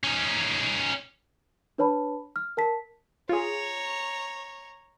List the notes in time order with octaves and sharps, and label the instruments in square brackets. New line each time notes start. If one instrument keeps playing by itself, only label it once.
[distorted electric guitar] C#4 D#4
[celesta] D4 B4 C#5 A5 B5
F6
A#4 A5 B6
[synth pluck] F4 G#4 [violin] C#5 A#5